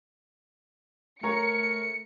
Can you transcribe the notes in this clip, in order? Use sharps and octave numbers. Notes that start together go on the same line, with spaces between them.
A3 A#4 C#5 A#5 C#7